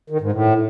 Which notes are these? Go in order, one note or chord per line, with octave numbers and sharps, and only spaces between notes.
D#3
G#2
A2